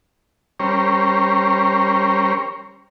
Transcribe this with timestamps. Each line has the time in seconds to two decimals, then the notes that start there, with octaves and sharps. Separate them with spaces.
0.60 G3 C#4 A#4 C5 C#5